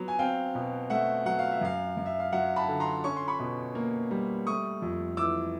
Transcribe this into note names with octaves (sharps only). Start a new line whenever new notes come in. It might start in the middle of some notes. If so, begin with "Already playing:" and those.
Already playing: F#3 B3
G#5
C4 F5 G5
B2
A3 E5 F#5
F#3 F#5
F5
E5
F#2 F5
F#2
E5
F5
F#3 E5 F#5
A5 B5
D3
A#5 C6
C#4 C#6
C6
B5 C#6
B2
A#3
G3
A3 C#6 D#6
F2
E3 D6 E6